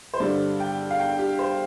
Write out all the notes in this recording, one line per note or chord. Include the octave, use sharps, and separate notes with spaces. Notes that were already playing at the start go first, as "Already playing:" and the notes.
C5
G2 D3 G3 D5
G5
F5
G5
G4
C5